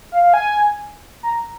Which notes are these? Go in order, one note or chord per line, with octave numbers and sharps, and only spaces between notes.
F5
F5
G#5
A#5